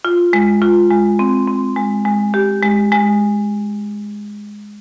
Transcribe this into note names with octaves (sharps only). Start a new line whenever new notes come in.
F4
G#3
F4
G#3
C4
C4
G#3
G#3
G4
G#3
G#3